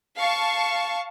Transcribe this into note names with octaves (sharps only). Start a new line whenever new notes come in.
F5 A5 C#6